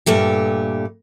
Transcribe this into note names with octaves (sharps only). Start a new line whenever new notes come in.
G2 A#2 A3 G4